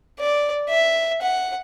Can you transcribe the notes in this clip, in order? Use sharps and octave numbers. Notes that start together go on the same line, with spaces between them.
D5
E5
F#5